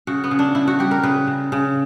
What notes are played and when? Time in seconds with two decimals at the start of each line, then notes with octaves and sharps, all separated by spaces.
0.07 C#3 F#4
0.24 B3
0.31 C#3
0.39 D4
0.55 C#3 E4
0.68 F#4
0.79 G3 G4
0.91 A#4
1.03 C#3 B4
1.27 C#3
1.52 C#3